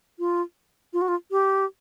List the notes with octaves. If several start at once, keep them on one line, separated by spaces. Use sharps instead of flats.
F4
F4
F#4
F4
G4